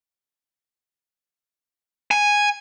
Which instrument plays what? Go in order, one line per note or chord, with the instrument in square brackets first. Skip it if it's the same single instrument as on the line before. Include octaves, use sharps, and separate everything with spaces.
[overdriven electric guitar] G#5